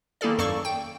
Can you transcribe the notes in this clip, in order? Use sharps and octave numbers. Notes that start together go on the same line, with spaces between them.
D#3 A#3 E4 G#4 A4 D5
F#2 A4 D5 F5 C#6
G5